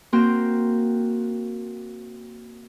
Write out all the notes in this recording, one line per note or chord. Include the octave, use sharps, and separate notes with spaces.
A#3 C4 F#4 G5 A#5 C6